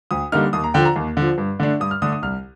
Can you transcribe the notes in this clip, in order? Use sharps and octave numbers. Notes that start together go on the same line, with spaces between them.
D2 D#6
D3 G3 A#3 D#4 F6
D#2 D#6
A#5
D3 F3 G5
A#5
D#2
D3 F3
G2
D3 A3 D4
G2 D#6
F6
D3 A3 D4 D#6
D#6
C2 F6